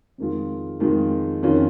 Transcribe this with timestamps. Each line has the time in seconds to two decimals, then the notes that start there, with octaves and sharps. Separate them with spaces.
0.18 F2 D#3 G#3 F4
0.80 F2 D#3 G#3 F4
1.42 F2 D#3 C#4 F4